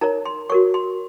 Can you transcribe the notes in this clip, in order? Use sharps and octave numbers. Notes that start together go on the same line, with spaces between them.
D#4 A#4 C#5 A#5
C6
F#4 A#4 C#5 C#6
C6